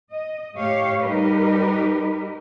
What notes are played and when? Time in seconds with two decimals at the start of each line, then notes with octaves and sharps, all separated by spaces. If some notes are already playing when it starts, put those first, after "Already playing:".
0.11 D#5
0.55 A2 G4 C#5 F5
1.02 G3 D#4 G4 A#4 B4